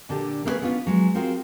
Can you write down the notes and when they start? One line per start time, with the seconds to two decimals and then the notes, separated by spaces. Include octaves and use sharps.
0.09 A#2 D3 D4 G4
0.45 A#3 C#4 E4 F#4 G#4 B4
0.63 B3 C#4 D4 F4
0.87 F#3 G#3
1.15 C4 F4 F#4 G#4 A#4